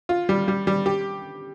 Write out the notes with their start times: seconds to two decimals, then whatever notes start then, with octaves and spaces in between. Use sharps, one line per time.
0.09 F4
0.29 G3
0.48 G3
0.67 G3
0.86 G4